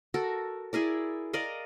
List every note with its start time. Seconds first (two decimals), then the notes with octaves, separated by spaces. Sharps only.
0.14 F#4 A4 A#4
0.73 E4 G#4 A#4 D5
1.33 A#4 D5 D#5 F5